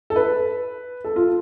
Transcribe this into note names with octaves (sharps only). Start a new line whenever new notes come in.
A4
B4
A4
F4